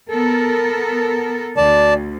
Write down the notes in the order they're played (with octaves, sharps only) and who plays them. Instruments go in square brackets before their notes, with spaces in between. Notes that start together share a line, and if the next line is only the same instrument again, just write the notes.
[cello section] B3 A4 A#4
[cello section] D2 [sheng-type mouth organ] D5 A5